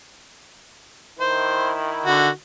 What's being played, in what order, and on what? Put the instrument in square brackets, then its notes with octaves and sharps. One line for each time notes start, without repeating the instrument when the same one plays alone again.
[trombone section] D#3 E4 [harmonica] C5
[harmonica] D3 F#4